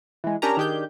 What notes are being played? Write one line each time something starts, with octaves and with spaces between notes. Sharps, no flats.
E3 G#3
C#4 D4 G4 A#4 G#5 A#5
D#3 D4 G4 G#4 G6